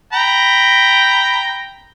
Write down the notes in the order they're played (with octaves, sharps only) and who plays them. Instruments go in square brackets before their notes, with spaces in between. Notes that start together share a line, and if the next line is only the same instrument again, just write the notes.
[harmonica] G5 A#5 B5